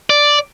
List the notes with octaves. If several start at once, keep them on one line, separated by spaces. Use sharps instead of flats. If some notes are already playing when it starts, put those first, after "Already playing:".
D5